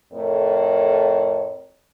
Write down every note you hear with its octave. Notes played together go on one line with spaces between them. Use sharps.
F2 A2 A#4 C#5